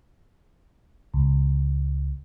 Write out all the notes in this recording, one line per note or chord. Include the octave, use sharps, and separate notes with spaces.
C#2